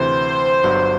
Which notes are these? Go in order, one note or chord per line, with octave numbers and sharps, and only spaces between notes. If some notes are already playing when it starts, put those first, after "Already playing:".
Already playing: D2 C3 E3 C5
G1 G2 F#3